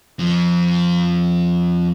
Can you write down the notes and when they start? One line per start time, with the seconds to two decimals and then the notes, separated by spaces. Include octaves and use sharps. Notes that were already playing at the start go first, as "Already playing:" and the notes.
0.19 F2 F3